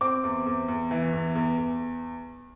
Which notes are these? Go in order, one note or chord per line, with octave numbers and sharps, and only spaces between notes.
C4 D6
E2
E2
E2
E3
E2
E2
E2